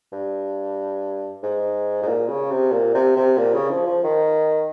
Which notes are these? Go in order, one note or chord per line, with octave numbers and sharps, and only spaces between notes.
G2
G#2
G#2
A#2
C#3
C3
A#2
C3
C3
A#2
C#3
F3
F3
D#3